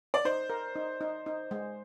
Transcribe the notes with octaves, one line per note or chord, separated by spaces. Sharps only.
D5
D#4 C5
A#4
D#4
D#4
D#4
G#3